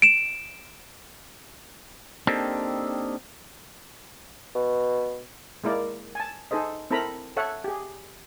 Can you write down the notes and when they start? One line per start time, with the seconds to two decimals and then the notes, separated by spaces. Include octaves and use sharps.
0.02 D7 E7
2.27 A#3 C4 D4 D#4 G4 A4
4.55 B2
5.64 G#3 A#3 E4 A#4 D5
6.15 G#5 A5
6.51 D#4 G#4 A4 C5 D#5
6.91 C4 E4 A4 A#4 A#5 B5
7.37 A4 C#5 E5 F#5
7.64 G4 G#4